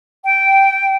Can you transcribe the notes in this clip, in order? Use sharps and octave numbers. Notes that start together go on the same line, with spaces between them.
G5